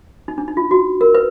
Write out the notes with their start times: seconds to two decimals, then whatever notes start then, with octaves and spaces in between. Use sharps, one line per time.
0.28 D#4
0.38 D4
0.48 D#4
0.57 F4
0.71 F#4
1.01 A#4
1.15 B4